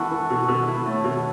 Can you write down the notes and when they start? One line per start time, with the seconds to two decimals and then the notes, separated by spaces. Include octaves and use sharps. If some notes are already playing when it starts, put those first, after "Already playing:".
Already playing: E3 B3 F#4 A4
0.11 E3
0.30 B2
0.48 B2
0.67 E4
0.86 A3 A4 C#5
1.04 B2